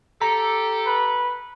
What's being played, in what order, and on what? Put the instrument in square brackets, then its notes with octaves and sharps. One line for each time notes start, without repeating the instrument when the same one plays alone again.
[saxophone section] G4 A4 [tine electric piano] A#5
[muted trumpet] B4